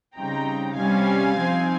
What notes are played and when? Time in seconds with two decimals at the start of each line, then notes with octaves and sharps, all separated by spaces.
0.17 C#3 G3 C4 D#4 G5 A#5
0.77 C3 G3 C#4 F5 G#5
1.38 F3 C4 D#4